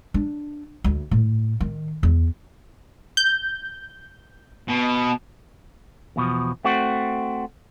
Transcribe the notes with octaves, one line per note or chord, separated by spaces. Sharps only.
D4
D2
A2
D#3
E2
G6
B2
E2 B2 F3
A3 C4 F#4